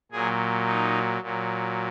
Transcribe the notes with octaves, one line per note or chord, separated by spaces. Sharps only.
A#2 F#3 G#4
D#4
A#2 F#3